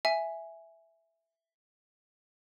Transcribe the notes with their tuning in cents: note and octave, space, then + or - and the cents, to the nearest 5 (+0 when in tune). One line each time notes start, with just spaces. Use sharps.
E5 +0 G#5 +0